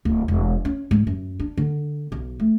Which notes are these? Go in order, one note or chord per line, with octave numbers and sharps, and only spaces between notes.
D1
E1
C#4
G#2
F#2
D4
D3
B1
A3